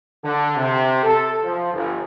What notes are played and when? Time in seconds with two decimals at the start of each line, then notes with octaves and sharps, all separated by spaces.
0.24 D3
0.57 C3
1.03 A4
1.44 F3
1.74 G1